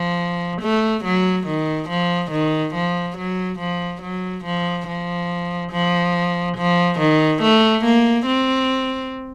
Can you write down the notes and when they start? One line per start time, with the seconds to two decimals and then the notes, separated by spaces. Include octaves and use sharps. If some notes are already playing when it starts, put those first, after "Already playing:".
Already playing: F3
0.62 A3
1.05 F#3
1.47 D#3
1.90 F3
2.31 D#3
2.74 F3
3.17 F#3
3.59 F3
4.02 F#3
4.44 F3
4.87 F3
5.72 F3
6.57 F3
6.99 D#3
7.42 A3
7.84 A#3
8.26 C4